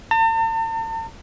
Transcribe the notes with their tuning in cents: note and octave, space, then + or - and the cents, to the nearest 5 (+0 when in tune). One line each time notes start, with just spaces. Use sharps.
A5 +45